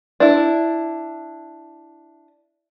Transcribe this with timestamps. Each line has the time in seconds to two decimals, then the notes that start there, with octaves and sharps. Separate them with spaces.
0.20 D4 E4